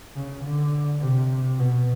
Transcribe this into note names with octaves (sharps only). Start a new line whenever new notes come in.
C#3
D3
C3
B2